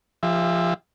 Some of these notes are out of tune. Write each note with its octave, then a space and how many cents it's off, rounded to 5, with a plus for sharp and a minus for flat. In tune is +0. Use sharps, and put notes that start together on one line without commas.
F3 -10 G4 +40 E5 +0